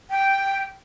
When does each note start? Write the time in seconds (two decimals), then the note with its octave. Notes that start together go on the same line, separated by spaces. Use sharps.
0.11 G5